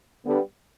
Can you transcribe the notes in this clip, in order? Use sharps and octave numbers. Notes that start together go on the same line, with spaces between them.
D3 G3 B3